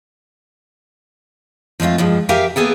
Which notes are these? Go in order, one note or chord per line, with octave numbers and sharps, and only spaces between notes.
F3 G#3 A3 C4 F4
G2 F3 G#3
G4 A#4 E5 F5 G5 G#5
A#3 B3 G#4 A4 G5